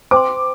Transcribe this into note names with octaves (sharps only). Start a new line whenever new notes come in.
C5 G5 C6 D6